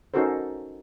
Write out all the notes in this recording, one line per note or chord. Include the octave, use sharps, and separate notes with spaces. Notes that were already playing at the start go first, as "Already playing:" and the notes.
C#4 D#4 F#4 A4 A#4 C5